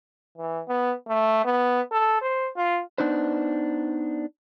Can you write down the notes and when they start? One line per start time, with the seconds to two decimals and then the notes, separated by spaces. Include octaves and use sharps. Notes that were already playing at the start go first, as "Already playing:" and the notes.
0.38 E3
0.68 B3
1.08 A3
1.45 B3
1.92 A4
2.21 C5
2.56 F4
2.98 B3 D4 D#4 B4 C5